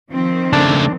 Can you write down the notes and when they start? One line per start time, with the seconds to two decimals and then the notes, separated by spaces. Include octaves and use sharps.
0.11 D#3 F3 C4
0.53 C#3 A3 D4